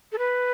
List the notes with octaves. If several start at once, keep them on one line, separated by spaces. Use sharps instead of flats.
A4
B4